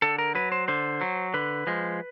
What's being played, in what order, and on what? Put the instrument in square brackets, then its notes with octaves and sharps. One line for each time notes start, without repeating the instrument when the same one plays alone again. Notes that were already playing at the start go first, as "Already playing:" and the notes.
[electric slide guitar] D3 A4
A#4
F#3 B4
C5
D3 C5
F#3
D3 B4
F3 G#3